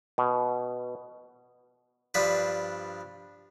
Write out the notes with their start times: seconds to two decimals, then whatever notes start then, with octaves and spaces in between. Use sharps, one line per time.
0.18 B2
2.14 G2 F3 D4 B4